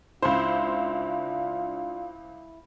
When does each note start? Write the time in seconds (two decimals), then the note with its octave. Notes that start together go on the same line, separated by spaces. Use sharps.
0.22 C#2 D4 E4 F4 C5